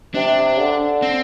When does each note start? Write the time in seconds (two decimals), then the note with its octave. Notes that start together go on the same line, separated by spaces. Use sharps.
0.14 C3 D4
0.58 D3
1.02 C4